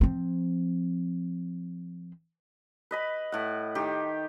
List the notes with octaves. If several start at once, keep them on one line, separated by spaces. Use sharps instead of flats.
F3 C4
B4 D#5 B5
A2 F#5
D#3 G4